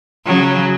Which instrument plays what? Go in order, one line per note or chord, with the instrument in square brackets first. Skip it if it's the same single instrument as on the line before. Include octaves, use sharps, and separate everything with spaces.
[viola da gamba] C#3 F#3